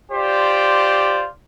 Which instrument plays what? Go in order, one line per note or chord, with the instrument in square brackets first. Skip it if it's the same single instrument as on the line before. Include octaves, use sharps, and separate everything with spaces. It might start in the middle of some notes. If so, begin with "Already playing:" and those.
[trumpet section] F4 G4 C5 D5